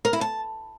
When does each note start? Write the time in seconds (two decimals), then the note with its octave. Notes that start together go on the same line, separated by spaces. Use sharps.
0.05 A#4
0.13 E4
0.21 A5